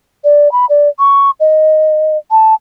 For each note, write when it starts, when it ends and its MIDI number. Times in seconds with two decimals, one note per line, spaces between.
0.24 0.51 74
0.52 0.65 83
0.69 0.88 74
0.99 1.30 85
1.40 2.18 75
2.31 2.54 81